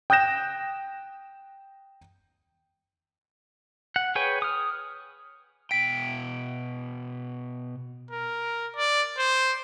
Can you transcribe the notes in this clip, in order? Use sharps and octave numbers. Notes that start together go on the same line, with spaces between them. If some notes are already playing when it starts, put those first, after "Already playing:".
G5 D#6 F#6 G6 A#6 E7
F#5
G#4 B4 C#5 G5 G#5
D#6 F6
B2 G5 B6 D7
A#4
D5
C5